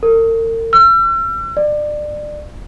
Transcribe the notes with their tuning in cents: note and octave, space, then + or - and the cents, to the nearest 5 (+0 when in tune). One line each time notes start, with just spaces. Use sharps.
A#4 -45
E6 +40
D5 +25